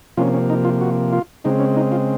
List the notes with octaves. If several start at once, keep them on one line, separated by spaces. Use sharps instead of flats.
C3 F3 A#3 C#4 F4
C#4
D#4
F4
F#4
F4
C#3 G#3 C4 D#4
C#4
D#4
F4